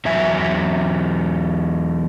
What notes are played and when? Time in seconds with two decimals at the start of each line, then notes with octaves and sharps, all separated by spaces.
0.05 E2 F#3 E5 G#5